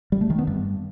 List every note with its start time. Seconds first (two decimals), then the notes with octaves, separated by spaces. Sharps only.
0.12 G3
0.21 A3
0.30 D#3
0.39 B3
0.47 G2